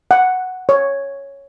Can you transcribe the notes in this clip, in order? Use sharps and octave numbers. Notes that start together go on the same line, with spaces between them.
F#5
C#5